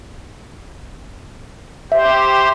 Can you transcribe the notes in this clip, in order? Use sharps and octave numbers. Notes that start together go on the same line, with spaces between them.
G4 C5 E5